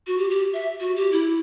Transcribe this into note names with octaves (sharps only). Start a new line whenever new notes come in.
F#4
G4
G4
E5
F#4
G4
E4